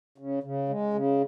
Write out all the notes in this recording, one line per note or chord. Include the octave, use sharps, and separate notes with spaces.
C#3
C#3
G#3
C#3